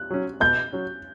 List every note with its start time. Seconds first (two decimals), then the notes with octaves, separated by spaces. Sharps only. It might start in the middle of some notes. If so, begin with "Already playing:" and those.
Already playing: F#6
0.10 F#3 C#4
0.40 B2 G6
0.72 F#3 C#4